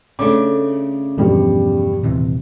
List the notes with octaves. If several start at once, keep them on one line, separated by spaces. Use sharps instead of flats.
C#3 A3 D4 D6
E2 G2 B2 F3 G3
D#1 C3 E3